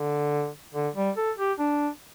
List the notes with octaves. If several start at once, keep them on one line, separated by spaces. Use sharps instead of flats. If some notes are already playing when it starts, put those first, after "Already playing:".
Already playing: D3
D3
G3
A4
G4
D4